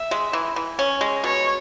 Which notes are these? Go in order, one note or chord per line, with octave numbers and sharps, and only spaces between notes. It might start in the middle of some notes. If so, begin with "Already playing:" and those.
Already playing: E5
G#3
E3
E3
C#4
G#3
B2 C#5